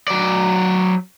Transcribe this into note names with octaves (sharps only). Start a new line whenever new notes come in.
F#3 D5